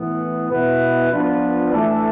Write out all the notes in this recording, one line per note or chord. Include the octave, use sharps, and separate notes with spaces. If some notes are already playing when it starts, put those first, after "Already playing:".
Already playing: A2 E3 B3
B2 B3 E4 B4
F3 B3 D4 F4 B4
A2 E3 A3 D4 A4